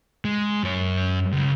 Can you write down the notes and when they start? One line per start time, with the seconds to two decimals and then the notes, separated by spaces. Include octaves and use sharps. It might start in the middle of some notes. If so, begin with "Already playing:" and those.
0.25 G#3
0.63 F#2 C#5
1.32 C#2